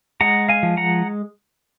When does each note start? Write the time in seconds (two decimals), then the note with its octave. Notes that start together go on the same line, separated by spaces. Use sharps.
0.21 G#3 F#5 A#5
0.49 F5 G#5
0.63 F3
0.77 F#5 A#5